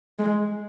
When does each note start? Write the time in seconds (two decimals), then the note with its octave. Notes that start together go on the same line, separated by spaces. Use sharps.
0.19 G#3